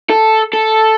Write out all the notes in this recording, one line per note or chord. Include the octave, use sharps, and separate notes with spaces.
A4
A4